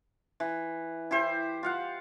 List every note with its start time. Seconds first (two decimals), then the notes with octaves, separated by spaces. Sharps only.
0.40 E3
1.11 E4 G4 C5
1.63 F4 F5 F#5